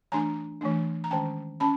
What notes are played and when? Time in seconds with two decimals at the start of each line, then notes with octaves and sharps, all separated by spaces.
0.12 E3 A3 D4 G#5 A#5
0.61 E3 A3 D4
1.04 A#5
1.10 D#3 G#3 C#4 G5 A5
1.60 C#4 A5 B5